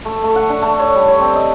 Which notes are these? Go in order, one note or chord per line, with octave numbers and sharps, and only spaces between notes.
A3
A3
F#5
D4
A3
C#5
G3
C#5
C4
D#5